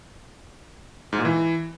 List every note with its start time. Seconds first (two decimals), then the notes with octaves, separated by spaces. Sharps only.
1.13 G#2
1.19 A#2
1.25 E3